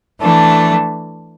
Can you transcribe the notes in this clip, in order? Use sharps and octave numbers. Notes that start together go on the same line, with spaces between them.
E3 A3 D4